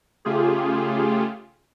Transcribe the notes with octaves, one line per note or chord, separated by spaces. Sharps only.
C#3 A3 F4 G4 G#4